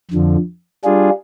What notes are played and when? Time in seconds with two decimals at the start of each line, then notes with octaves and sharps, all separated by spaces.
0.11 F2 D3 F3
0.84 G3 D4 F4 G#4